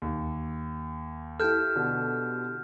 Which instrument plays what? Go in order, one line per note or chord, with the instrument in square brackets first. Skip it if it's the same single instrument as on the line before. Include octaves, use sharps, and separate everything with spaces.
[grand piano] D#2
[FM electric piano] E4 G4 A4 [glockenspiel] F6 G6
[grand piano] B2 D3